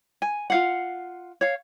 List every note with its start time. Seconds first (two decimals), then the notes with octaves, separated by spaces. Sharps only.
0.22 G#5
0.50 F4 F5 F#5
1.41 C#5 F5